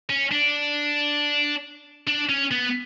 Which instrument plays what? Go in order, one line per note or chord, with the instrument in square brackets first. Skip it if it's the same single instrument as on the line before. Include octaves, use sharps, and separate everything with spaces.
[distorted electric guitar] C#4
D4
D4
C#4
B3